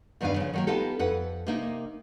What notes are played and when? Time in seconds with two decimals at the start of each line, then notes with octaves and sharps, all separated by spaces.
0.21 E2 G2 D#3 B3 B4 F5
0.36 C#3 F3
0.53 D#3 F#3 A#3
0.67 B3 D#4 F4 G4 A4
0.99 F2 B4 F#5
1.47 C3 A#3 D#4